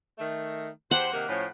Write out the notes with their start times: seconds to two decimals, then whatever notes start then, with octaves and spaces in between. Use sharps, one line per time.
0.18 D#3 A3
0.91 E2 G4 C5 F#5
1.12 C3 D#3 A#3
1.29 A2 F3 C#4